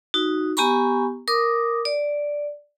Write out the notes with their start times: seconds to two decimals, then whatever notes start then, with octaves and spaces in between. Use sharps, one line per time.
0.14 D#4 F#4
0.57 B3 G4 G#5 A#5 B5 C#6
1.28 A#4 D6 D#6
1.85 D5